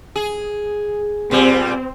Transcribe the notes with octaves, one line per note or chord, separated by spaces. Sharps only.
G#4
A#2 G3 C4